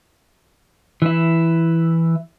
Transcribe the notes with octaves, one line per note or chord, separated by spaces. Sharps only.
E3 E4